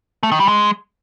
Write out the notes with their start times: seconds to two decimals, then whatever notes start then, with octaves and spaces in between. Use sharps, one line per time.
0.23 A3
0.32 D#3
0.40 G3
0.48 G#3